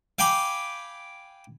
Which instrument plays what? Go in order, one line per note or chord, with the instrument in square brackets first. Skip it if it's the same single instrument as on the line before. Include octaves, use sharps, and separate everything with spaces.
[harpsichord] F5 G5 G#5 B5 D6